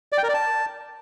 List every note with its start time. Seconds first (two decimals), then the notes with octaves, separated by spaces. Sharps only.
0.12 D5
0.18 G5
0.23 A#4
0.29 D5
0.34 A5